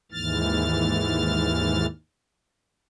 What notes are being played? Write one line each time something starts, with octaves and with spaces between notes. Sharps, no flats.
D#2 G#2 E3 F6 A6